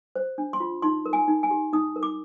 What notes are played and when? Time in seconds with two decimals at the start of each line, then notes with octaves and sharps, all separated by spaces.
0.16 C5
0.38 D4
0.53 C6
0.60 F4
0.82 D#4 C6
1.06 A#4
1.13 G#5
1.28 D#4
1.43 G#5
1.51 G4
1.73 D#4 D#6
1.96 A#4
2.03 D6